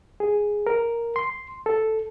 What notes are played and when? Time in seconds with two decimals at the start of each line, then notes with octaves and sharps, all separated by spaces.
0.20 G#4
0.67 A#4
1.16 C6
1.66 A4